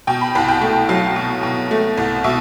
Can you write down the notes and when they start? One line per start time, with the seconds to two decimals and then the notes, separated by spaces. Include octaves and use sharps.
0.07 B2 G5
0.21 B5
0.35 C2 B5
0.48 G5
0.61 A3
0.89 F#3 F5
1.16 B2
1.43 B2
1.71 A3
1.97 C2
2.24 B2 E5